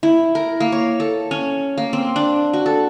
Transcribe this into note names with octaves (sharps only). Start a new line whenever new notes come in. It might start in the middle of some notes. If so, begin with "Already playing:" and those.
E4
A#4
A#3
C#5
A4
C#4
A#3
C4
D4
F#4
A4